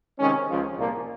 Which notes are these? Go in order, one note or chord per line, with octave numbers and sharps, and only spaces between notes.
C3 D#3 G#3 C#4
C#2 C#3 F3
C2 A#2 F3 A#3